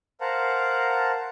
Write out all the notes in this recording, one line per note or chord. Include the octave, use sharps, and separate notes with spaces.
A#4 C5 F5 F#5 A5 A#5